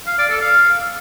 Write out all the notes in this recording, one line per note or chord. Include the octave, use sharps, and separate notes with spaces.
F5
D5
A4
F5